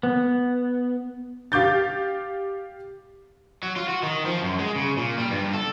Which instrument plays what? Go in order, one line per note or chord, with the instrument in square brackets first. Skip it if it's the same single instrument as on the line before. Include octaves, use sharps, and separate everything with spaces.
[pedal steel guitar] B3
[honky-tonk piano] G4 F5 D6 G6 A6
[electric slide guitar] F#3
F4
F#4
D#3
F3
F#2
G#3
C#3
A#2
G3
G2
A4